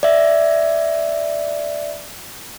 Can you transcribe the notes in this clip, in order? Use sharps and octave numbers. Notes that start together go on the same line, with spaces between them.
D5 E5